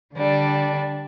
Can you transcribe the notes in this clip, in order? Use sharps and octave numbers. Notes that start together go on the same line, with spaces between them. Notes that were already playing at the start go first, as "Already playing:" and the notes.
D3 G3 D4